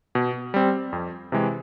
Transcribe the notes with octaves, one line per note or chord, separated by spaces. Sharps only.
B2
G3 C4
F2
C3 E3 G#3